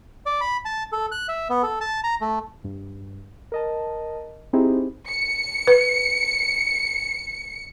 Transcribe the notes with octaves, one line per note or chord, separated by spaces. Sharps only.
D5
B5
A5
A4
F#6
E5
B3
A4
A5
A#5
A3
G2
A#4 D#5 A5
C4 D#4 E4 G4 G#4 C5
C#7
B4